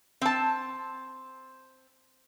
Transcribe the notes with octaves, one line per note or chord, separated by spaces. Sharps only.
C4 A5